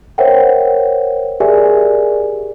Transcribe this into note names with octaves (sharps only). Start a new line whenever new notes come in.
A#4 C5 C#5 E5 F#5 G5
G4 G#4 A#4 D5 E5 G#5